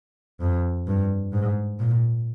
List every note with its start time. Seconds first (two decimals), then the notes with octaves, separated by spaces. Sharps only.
0.41 F2
0.87 G2
1.33 G#2
1.80 A#2